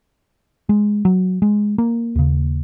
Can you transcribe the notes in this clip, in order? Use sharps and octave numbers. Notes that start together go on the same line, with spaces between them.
G#3
F#3
G#3
A#3
D#2 C#3